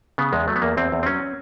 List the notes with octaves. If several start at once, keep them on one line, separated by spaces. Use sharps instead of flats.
C#3 B3
E2 G#3
F#3 A3
B3
E2 A#3
E2 C4
E2
C4
F#3 C#4